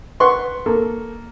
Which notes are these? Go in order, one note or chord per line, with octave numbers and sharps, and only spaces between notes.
B4 F#5 C6 C#6
A#3 A4